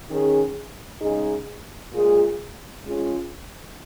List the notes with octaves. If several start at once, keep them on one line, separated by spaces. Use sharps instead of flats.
D#3 C#4 G#4
C#3 G#3 D#4 G#4
A#2 G#3 F4 G#4
G#3 C#4 F4 G#4